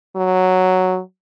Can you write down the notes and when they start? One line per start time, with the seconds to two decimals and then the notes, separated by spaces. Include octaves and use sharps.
0.16 F#3